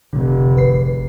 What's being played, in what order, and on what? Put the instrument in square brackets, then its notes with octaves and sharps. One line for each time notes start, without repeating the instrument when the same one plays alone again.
[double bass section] F1 [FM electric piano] D3
[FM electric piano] G#1 B4 C7